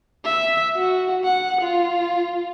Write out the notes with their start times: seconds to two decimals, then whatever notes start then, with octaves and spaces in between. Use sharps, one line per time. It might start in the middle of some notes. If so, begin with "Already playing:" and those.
0.25 E5
0.77 F#4
1.24 F#5
1.61 F4